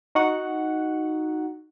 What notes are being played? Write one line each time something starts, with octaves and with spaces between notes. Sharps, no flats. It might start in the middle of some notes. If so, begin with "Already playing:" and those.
D#4 F#4 F#5